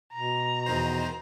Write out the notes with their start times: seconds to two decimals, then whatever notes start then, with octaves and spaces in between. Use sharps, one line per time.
0.13 B2 A#5
0.66 E2 D#3 C5